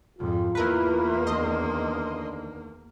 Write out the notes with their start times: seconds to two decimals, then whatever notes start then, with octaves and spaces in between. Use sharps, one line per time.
0.19 F2 G#2 F4
0.55 E2 A#3 E4 A#4 B4
1.27 D2 D#3 D4 D#5 C6